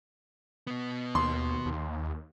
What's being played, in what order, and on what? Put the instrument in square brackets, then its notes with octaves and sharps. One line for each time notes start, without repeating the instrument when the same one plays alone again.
[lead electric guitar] B2 B3
[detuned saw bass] D#2 [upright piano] C6
[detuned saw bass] D#2